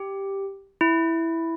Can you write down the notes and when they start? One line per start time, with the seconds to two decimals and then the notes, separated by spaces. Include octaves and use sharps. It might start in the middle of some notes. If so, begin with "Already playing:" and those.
Already playing: G4
0.81 E4